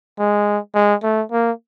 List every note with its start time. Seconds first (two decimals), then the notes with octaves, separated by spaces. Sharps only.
0.19 G#3
0.75 G#3
1.03 A3
1.32 A#3